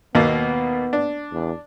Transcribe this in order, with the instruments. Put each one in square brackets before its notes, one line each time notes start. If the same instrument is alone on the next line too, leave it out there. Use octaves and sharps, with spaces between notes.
[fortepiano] D#2 B2 A#3 [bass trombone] B3
[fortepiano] D4
[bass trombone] E2